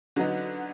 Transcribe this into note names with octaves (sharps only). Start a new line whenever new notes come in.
D3 F#3 B3 D#4